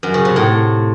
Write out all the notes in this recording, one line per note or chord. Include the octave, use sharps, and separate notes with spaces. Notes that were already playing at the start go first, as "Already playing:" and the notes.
F#2
C#3
C3
A2